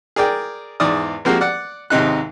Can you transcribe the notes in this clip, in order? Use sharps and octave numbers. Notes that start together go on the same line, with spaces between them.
G#4 A#4 D5 G5
E2 G#2 D5 D#6
F3 G#3 A#3 C4 F#4 G4
D5 F#5
D#2 G#2 C3 D#4 F#6